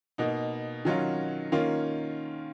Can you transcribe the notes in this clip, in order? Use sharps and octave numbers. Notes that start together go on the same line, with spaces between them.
B2 A#3 D#4
D#3 F#3 C#4 F4
D#3 A#3 C#4 F4